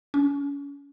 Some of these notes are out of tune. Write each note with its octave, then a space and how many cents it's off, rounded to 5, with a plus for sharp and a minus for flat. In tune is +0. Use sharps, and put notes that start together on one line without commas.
C#4 +35